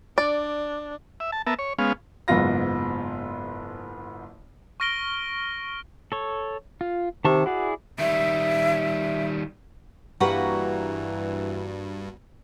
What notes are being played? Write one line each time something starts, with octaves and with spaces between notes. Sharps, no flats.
D4 D5
E5
A5
B3 A#4 E5 A5
C#5
G#3 B3 C#4 F5
F#1 G#2 B3 F4 A#6
C#6 F6 A#6 D7 G7
A4 C#5
F4
C3 D#3 A5 C#6
E4 F#4 G#4 D5
D#3 G3 E5
G2 E3 A#3 F#4 G4 B4 F#5